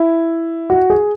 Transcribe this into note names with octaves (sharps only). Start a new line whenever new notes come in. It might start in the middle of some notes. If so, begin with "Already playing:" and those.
Already playing: E4
F#4
G#4